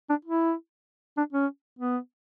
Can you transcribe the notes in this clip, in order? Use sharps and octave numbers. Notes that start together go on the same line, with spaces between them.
D4
E4
D4
C#4
B3